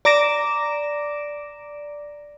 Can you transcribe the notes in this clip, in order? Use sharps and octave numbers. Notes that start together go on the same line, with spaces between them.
D5 A#5 D6 A#6 D7 E7